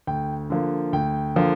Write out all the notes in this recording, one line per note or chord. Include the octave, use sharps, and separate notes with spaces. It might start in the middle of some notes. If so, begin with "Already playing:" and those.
D2 G5
D3 F3 A#3
D2 G5
D3 F3 A#3